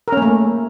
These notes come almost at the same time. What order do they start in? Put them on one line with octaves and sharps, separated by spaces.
A#4 C#4 A#3 A3